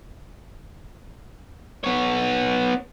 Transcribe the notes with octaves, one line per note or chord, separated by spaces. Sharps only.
B3 C#5